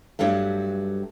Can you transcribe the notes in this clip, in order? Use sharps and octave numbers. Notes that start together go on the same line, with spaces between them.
G2 F#3 G3 A3